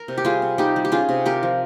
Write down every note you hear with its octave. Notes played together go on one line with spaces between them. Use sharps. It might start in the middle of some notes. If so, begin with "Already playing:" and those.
Already playing: A#4
C3
G4
G3 F4 G#4
C3
G3 D#4 G4
G3
G4
C#4 F4 G#4
C3
C4 G4 A#4
F3